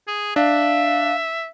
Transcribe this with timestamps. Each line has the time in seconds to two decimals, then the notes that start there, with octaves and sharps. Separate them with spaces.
0.07 G#4
0.36 D4 E5 F5